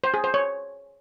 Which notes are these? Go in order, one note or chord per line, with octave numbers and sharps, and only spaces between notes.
C5
G#4
C5
C#5